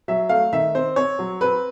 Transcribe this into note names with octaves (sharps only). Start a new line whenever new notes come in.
F#3 E5
A3 F5
D#3 E5
C4 C5
C4 C#5
F#3
C4 B4